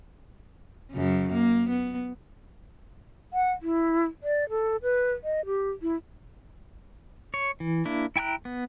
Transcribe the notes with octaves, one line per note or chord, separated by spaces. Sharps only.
F#2 C#3
A#3
B3
F#5
E4
D5
A4
B4
D#5
G4
E4
C#5
E3
A#3 D4 E4
E4 G5 G#5 A#5 F#6
B3